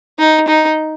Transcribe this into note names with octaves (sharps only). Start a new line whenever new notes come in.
D#4
D#4